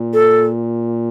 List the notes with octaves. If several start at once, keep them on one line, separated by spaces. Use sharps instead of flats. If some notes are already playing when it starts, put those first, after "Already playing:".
Already playing: A#2
A4